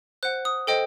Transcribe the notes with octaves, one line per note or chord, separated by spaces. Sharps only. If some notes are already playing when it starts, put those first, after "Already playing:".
C5 F#5 F#6
D#6
A4 C5 D#5 G5